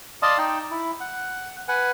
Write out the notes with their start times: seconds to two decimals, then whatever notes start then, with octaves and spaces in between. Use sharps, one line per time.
0.22 D5 D#5 F5 A5 C6 D#6
0.38 D#4 G5
0.71 E4
1.00 F#5
1.68 B4 F#5 G#5